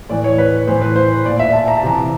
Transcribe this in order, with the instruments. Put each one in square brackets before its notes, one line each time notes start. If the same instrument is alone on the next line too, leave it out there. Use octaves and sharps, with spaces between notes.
[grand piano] A2 E3 D5
C#5
B4
A2 E3 C5
B4
C5
A#2 D5
E5
A5
A#5
A5
C3 E3 A#5